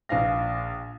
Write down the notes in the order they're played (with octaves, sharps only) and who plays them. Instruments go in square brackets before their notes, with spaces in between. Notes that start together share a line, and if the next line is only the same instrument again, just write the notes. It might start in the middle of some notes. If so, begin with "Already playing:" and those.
[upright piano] A#1 F4 F5 A#6